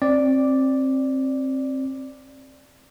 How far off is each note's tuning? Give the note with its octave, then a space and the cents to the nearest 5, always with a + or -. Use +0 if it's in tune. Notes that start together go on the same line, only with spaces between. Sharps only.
C4 +25 D5 +0